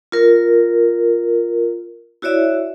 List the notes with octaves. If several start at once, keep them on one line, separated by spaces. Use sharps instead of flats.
F4 A#4
E4 F#4 C#5 D5 E5